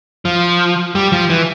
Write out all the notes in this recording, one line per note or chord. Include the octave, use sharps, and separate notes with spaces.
F3
G3
F3
E3